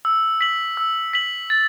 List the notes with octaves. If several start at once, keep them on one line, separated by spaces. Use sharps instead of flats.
E6
B6 F#7
E6
B6 F#7
A6